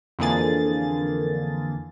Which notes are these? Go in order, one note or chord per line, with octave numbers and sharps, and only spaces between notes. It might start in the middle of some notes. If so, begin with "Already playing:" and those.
F2 D3 E3 A#3 G#4 A6